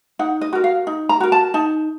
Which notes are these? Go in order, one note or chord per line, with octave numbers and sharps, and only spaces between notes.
D#4 F#5
D#5
F#4 A#4
F5
D#4
A#5
F#4 A#4
A5
D#4 A5